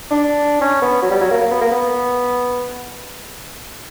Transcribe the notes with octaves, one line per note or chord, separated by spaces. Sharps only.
D4
C#4
B3
F#3
G3
F#3
A#3
A#3
B3
A#3
B3